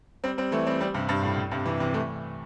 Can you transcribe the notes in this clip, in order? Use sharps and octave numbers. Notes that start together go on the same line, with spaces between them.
G3 C4
G3 C4
E3 A3
G3 C4
G3 C4
G2 C3
G2
A2
A2
G2 C3
C3 E3
C3 E3
E3 A3